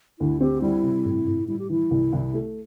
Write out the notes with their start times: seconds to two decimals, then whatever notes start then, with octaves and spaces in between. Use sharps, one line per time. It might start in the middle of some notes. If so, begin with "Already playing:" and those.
0.19 D2 E4
0.41 C4 G4
0.62 G3 E4
0.83 C3
1.05 A2
1.27 A2
1.48 G3 E4
1.59 G4
1.69 E3 E4
1.91 C2
2.13 C2
2.34 A3